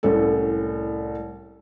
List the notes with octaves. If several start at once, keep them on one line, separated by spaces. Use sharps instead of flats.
C2 A2 C#4 A4